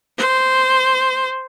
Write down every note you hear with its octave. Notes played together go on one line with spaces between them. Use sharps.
C5